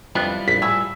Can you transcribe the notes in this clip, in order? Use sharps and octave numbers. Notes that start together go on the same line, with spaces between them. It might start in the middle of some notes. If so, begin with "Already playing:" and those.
F2 G3 B3 D4 E4 F4
A#1 B6
A2 G#4 E6